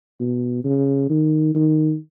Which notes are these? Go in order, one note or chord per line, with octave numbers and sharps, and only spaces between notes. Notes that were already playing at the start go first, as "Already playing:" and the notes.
B2
C#3
D#3
D#3